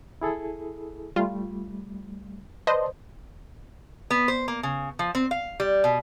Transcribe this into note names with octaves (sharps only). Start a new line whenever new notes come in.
E4 G#4 A4
G3 A3 F4
B4 C5 D5 D#5 A5 C6
B3
C5
A#3
C#3
F3
C4
F5
G3
B2